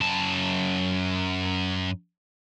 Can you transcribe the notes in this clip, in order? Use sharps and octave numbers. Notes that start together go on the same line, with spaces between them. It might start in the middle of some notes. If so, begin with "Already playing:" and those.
F#2 A5